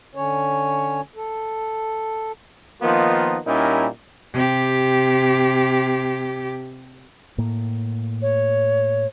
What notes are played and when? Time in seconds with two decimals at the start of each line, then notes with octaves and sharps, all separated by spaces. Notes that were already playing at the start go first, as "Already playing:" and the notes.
0.15 D3 C#4 C#5
1.16 A4
2.82 D#3 F3 A#3 B3 D#4 F4
3.46 A#2 G3 C#4 D#4 E4 A#4
4.33 C3 G4
7.38 A2 A#3
8.22 C#5